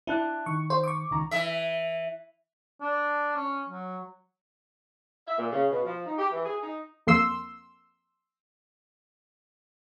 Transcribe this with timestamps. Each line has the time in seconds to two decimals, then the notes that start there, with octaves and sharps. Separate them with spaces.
0.07 D4 E4 A5 F#6
0.46 D#3 C#6
0.70 C5
0.84 C#6 D6
1.11 C#2 D#3 A#5
1.31 E3 E5
2.81 D4
3.36 C#4
3.68 F#3
5.27 E5
5.38 A#2
5.51 C#3
5.70 B2
5.85 F3
6.06 D#4
6.18 G4
6.31 E3
6.45 G#4
6.62 D#4
7.07 F2 A#3 C6 E6